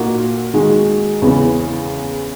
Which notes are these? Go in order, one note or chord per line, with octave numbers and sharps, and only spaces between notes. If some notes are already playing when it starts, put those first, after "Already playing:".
Already playing: A#2 A#3 D#4 F#4
D#3 G#3 D#4 F#4
E2 C#3 E3 B3